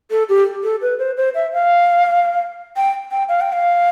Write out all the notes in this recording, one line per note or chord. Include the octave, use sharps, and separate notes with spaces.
A4
G4
A4
B4
C5
C5
E5
F5
G5
G5
F5
G5
F5